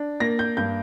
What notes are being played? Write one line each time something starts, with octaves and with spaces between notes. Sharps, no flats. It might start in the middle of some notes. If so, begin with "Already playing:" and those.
Already playing: D4
A#3 A#6
G6
G2 G6